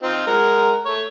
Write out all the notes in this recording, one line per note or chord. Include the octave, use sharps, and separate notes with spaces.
C4 D#4 F4
G#3 A#4 F#5
A3 C#5